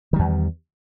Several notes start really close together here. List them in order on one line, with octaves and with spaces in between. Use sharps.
D#3 G3 E2